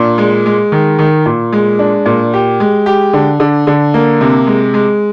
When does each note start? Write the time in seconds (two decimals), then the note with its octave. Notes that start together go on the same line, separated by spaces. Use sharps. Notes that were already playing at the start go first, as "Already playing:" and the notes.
Already playing: A#2 D4
0.18 G#3
0.46 G#3
0.72 D#3
0.99 D#3
1.26 A#2
1.53 G#3
1.79 D4
2.06 A#2
2.34 G4
2.60 G#3
2.86 G4
3.13 D3
3.40 D3
3.67 D3
3.94 A#3
4.21 C3
4.47 G#3
4.74 G#3